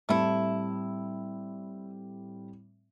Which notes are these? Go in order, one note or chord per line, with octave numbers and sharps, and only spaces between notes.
A2 G3 A3 C4 E4